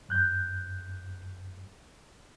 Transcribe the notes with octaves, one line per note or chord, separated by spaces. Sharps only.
F#2 F#6 G6